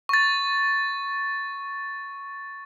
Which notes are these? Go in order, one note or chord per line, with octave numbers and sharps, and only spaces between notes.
C#6 A6